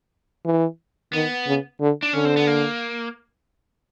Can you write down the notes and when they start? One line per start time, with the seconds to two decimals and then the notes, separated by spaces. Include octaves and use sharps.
0.45 E3
1.13 D#3 B3
1.47 C#3
1.80 D3
2.03 D4
2.13 D3 C#4
2.25 C4
2.37 B3
2.47 A#3